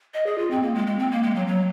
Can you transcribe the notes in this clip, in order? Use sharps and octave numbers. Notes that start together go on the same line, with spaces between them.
D#5
G#4
F4
C4
A#3
G#3
G#3
C4
A#3
G#3
F#3
F#3